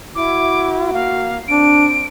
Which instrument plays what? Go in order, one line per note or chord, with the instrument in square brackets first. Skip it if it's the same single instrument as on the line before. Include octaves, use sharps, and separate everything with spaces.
[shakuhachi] E4 [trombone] F#4 [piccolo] D6
[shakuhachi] A#3 [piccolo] F5
[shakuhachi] C4 [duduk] D4 [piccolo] D7